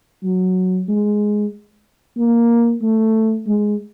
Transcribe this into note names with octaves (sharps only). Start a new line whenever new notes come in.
F#3
G#3
A#3
A3
G#3